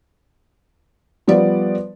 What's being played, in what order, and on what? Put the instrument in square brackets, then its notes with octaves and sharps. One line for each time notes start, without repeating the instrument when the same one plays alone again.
[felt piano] F3 G3 B3 D5